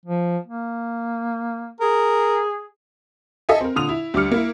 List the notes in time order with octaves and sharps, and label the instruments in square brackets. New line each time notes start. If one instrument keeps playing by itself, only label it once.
[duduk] F3
A#3
[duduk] G#4 [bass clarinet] A#4
[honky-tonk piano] A4 D#5 E5 G#5
C4 A#4
A#2 D3 D#6 F7
E4
D2 G3 D6 F6 C#7
A#3 E4